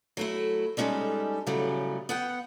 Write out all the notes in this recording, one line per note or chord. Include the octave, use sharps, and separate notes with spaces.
F#3 A3 E4
G3 G#3 C#4 D#4 A4
F#2 A2 C#3 F#3 G3 A3
B3 F#5 G5